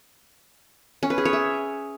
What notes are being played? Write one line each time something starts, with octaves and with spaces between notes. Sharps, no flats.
C#4
B4
G#4
C#5
E5